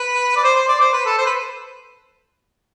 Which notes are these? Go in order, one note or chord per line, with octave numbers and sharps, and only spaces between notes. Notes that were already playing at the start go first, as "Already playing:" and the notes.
Already playing: B4
D5
C5
C5
D5
C5
B4
A4
C5
B4